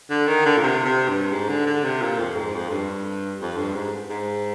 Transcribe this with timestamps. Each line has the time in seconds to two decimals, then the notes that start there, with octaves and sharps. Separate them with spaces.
0.10 D3
0.27 D#3
0.46 D3
0.58 A#2
0.63 C3
0.85 C3
1.09 G2
1.32 G#2
1.49 D3
1.67 D3
1.84 C3
2.02 A#2
2.19 F2
2.36 G#2
2.54 F2
2.71 G2
3.41 F2
3.58 G2
3.75 G#2
4.10 G#2